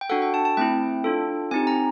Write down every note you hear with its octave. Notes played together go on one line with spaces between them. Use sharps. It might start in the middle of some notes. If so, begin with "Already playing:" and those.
G5
D4 F#4 A4 F#5
G5
A5
A5
A3 C4 E4 G5
D4 F4 A4
C4 D#4 G4 G#5
A#5